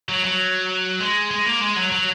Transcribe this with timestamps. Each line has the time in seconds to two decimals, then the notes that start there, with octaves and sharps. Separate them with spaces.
0.09 F#3
0.24 F#3
1.01 G#3
1.31 G#3
1.46 A#3
1.61 G#3
1.76 F#3
1.92 F#3